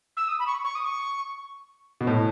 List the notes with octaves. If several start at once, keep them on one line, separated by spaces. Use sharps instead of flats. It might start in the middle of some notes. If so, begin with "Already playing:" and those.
E6
D#6
B5
C#6
C#6
D#6
C#6
B2
A2